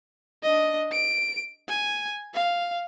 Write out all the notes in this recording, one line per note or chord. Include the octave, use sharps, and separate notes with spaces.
D4 D#5
D7
G#5
F5